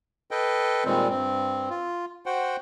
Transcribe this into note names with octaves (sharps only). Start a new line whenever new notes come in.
A4 B4 D#5 G5
A#2 D#3 G3 G#3 C4
G2 C4
F4
F#4 C5 F#5 G5